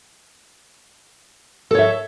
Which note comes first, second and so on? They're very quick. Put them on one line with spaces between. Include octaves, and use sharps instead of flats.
A4 C#5 E5